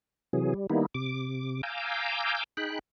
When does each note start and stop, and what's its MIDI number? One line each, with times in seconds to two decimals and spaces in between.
0.33 0.54 48
0.33 0.54 52
0.33 0.54 54
0.33 0.54 68
0.54 0.67 55
0.70 0.86 51
0.70 0.86 55
0.70 0.86 58
0.70 0.86 59
0.70 0.86 63
0.70 0.86 64
0.95 1.61 48
0.95 1.61 86
1.63 2.44 77
1.63 2.44 80
1.63 2.44 82
1.63 2.44 86
1.63 2.44 88
1.63 2.44 91
2.57 2.79 63
2.57 2.79 68
2.57 2.79 79
2.57 2.79 83
2.57 2.79 90